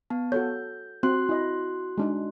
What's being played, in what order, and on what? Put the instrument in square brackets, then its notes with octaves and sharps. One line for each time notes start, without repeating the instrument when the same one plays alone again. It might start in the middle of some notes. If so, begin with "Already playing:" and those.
[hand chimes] B3 A5
[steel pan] F#4 A4 C#5 [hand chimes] G6
[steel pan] C4 [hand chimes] F#4 C6 F#6
[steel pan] E4 D#5
G#3 D4 D#4